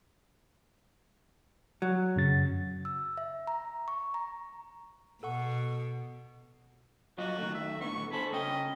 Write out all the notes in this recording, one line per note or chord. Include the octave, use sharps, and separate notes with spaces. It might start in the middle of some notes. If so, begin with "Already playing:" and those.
F#3
F#2 C#3 A6
E6
E5
A#5
C#6
A#5
B2 A4 F#5 C#6
F#3 F4 F#4 D#5
D#3 A3
E5
A2 D3 B3 C#6
G#4 A4 C5 B5
C#2 C#4 D#5 G5